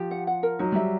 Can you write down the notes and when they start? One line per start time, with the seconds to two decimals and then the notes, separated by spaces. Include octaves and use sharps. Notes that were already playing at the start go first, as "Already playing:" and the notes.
Already playing: F3 G4
0.11 F#5
0.27 F#5
0.43 A#4
0.59 F#3 D#4
0.72 G3 E5